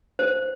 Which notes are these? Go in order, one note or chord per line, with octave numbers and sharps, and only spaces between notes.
C5